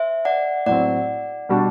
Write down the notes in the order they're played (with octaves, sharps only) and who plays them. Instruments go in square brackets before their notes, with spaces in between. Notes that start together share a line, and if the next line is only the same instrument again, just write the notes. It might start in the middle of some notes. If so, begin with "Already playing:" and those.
Already playing: [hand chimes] C5 E5
D5 F#5
[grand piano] A2 F#3 C4 [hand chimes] D5 F#5
[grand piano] B2 G3 D4 F#4